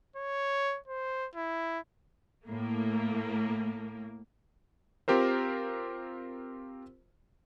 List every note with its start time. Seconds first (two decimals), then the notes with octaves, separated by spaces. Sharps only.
0.16 C#5
0.87 C5
1.35 E4
2.47 A2 A#3
5.08 C4 F4 G4 A#4 C5